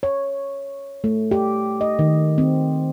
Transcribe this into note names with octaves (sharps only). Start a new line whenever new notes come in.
C#5
A3
G4
D#5
D#3
C4